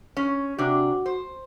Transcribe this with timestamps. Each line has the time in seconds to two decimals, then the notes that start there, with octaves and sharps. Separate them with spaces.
0.17 C#4
0.59 C3 D4 F#4
1.06 C5